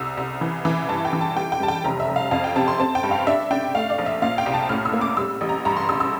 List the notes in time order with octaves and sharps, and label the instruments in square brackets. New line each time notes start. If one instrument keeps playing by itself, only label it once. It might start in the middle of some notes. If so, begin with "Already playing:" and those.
Already playing: [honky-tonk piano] C2 E6
C2
E3
E3
G2 A5
G5
E3
A5
G3 G5
G5
G3 A5
G5
F1 A#5
E5
F1
F5
F2 F5
G5
C3 A5
C6
C4 A5
G5
G2
F5
D4 E5
D4 G5
A3 F5
D5
A#1
E5
A#2 F5
G5
C2
A5
A2 F6
E6
A#3
D6
G3 E6
A1
A#5
G2 A#5
C6
A1 E6
E6